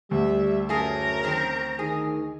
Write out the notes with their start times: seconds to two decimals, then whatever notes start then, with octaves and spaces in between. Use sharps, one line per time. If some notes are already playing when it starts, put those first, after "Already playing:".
0.11 D2 G3 E5
0.69 F#2 A3 G#4 A#4 A#5
1.24 D#3 C4
1.79 D#3 G#4